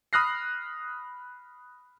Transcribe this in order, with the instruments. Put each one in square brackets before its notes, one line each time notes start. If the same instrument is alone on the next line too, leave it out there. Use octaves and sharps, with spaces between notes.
[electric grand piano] B5 D#6 F6 F#6 A#6 C7